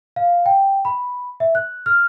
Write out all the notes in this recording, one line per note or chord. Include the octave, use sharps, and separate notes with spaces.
F5
G5
B5
E5
F#6
F6